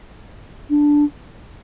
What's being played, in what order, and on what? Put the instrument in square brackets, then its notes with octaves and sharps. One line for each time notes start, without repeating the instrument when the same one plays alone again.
[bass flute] D4